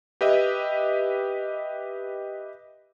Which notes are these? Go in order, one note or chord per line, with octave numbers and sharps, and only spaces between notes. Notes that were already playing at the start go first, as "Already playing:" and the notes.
G4 B4 D#5 E5